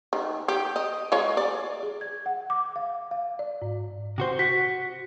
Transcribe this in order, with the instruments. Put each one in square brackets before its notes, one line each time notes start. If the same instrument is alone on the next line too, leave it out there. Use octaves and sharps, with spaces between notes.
[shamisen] D#3
G4
D#5
G#3 F4 C#5
D5
[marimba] G#4
G#6
F#5
D6
F5
F5
D5
G#2
[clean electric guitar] C3 F#4 C5
[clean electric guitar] F#4 [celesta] B6